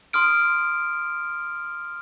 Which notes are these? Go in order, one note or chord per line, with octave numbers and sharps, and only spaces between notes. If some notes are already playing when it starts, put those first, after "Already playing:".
C6 D#6 F6 D7